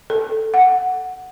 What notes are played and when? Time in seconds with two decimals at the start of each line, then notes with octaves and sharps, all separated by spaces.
0.10 A4
0.54 F#5